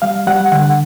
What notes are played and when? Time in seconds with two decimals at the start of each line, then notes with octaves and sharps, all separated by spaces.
0.02 G3 F5
0.27 G3 F#5
0.52 D3 F#5